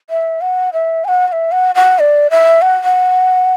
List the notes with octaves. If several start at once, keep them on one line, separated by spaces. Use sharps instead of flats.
E5
F#5
E5
G#5
F#5
F#5
E5
F#5
F#5
D5
E5
F#5
F#5